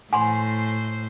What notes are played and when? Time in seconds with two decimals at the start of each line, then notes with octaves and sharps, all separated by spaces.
0.13 A2 C5 G#5 B5 C6